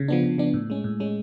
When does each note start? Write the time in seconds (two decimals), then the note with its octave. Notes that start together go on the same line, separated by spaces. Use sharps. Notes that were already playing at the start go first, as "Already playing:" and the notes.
Already playing: C#3
0.08 F3 B3 D4
0.24 C#3
0.38 F3 B3 D4
0.54 A2
0.70 G#3 C#4
0.84 A2
1.00 G#3 C#4